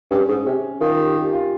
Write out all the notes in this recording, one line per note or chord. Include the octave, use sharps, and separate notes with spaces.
G2 C#4
G#2
C3 C#4
D#3 F4
G4
G4
F4